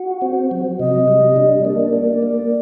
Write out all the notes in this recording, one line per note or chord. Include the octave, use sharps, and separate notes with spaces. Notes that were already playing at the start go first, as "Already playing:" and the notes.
Already playing: F#4
C4
F#3
C3 D#5
G3
D4
A#3 D5
A#3
A#3